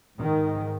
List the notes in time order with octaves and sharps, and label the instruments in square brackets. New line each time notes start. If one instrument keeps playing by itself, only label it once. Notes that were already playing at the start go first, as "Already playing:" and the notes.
[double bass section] G#2 D#3